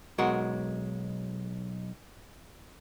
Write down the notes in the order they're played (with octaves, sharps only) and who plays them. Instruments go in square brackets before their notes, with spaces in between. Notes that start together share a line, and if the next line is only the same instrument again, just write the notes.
[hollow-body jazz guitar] B1 G#3 F#4 A#4